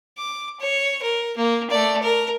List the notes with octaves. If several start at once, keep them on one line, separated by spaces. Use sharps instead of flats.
D6
C#5
A#4
A#3
A3 D5
A#4